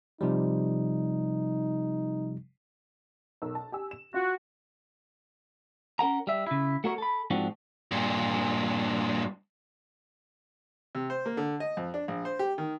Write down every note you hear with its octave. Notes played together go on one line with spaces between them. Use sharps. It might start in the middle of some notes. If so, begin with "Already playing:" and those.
C3 F3 G3 D#4
B1 A#4 E6
A5
G4 G#5 E6
E7
F4 F#4
C#4 A#4 F#5 A#5
G3 E5
C#3 E4
A3 F#4 A#4 C#5
A4 B5
G#2 F3 C4 D4 F#4
G2 A#2
C3
C5
A#3
D3
D#5
F2
D4
A#1
C5
G4
D#3